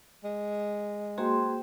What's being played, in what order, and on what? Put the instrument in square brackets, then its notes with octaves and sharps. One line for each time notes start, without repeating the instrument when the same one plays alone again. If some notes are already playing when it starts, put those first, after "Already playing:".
[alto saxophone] G#3
[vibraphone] A#3 F#4 G#4 [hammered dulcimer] C5 G5